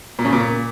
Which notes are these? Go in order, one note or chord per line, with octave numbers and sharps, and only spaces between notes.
A#2
C#3
A#2